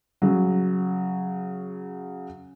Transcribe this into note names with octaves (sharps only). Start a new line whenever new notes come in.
C#3 F#3